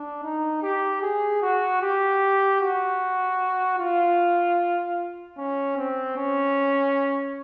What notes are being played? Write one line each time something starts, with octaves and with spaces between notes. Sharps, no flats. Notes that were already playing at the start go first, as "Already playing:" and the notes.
Already playing: D4
D#4
G4
G#4
F#4
G4
F#4
F4
C#4
C4
C#4